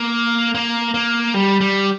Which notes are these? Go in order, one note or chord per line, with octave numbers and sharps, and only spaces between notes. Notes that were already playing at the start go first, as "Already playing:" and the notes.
Already playing: A#3
A#3
A#3
G3
G3